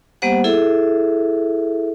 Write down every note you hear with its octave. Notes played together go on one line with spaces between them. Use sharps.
G3 A#3 B3 G4 C5 F#5
E4 G#4 A4 E5